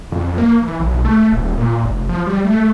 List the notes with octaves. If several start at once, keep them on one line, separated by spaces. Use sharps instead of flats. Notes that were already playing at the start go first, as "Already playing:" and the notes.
F2
A#3
E3
B1
A3
D#1
A#2
F1
F3
G3
A3